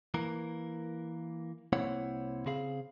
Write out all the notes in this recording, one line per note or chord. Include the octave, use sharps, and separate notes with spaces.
E3 A#3 A#4
C2 A#3 C4 E4 C#5 F#5
C#3 C4 G#4 F5